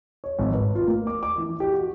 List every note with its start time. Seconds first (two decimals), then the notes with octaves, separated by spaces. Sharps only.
0.24 C#5
0.39 G#1
0.53 B4
0.75 F4
0.87 A#3
1.07 D6
1.23 D6
1.38 E3
1.60 G4
1.74 F#4